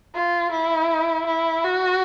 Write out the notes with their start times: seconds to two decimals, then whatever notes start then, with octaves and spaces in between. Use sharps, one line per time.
0.14 F4
0.52 E4
1.27 E4
1.64 F#4